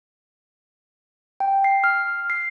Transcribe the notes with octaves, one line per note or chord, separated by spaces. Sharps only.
G5
C7
F6
C7